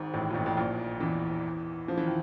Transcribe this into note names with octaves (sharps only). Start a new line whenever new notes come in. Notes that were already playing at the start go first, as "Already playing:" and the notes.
Already playing: G#1 G#2
A1 A2
A#2
A1 A2
A1 A2
A#1 A#2
E2 E3
F3
E3
D#3